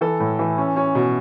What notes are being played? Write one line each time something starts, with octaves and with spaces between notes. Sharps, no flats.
E3 A4
A2
E3
C#4
C#4
B2